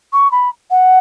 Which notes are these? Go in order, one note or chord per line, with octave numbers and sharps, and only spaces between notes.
C#6
B5
F#5